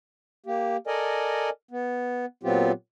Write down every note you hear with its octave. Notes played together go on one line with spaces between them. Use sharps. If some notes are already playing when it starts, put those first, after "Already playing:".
A#3 G4
A4 A#4 D5 D#5 G#5
B3
A#2 F#3 B3 C4 F4 G4